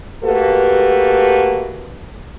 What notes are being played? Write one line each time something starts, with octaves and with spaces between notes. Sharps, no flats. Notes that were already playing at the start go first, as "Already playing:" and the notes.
A3 A#3 F#4 G4 A4 B4